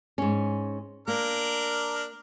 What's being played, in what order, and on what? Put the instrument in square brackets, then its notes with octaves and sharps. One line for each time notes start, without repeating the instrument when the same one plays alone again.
[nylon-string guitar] G#2 C#4
[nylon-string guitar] A#3 [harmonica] D4 A#4